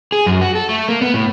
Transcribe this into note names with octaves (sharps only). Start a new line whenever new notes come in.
G#4
F#2
F#4
A4
A3
A#3
B3
A2